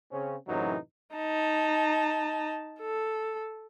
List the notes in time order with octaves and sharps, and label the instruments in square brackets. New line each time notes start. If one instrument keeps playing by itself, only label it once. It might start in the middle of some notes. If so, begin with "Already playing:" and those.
[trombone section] C#3 C4 C#4
F#2 A2 C3 E3 F#3 D#4
[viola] D#4 A5
A4